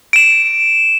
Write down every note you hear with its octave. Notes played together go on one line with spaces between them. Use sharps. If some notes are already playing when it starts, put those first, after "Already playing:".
D7 E7